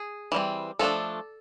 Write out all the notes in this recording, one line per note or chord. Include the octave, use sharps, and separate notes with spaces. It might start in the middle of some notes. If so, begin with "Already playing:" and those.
Already playing: G#4
E3 G3 C4
F3 A3 D4 A4